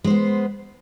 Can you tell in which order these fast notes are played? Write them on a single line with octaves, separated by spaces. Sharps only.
G#3 C5 B3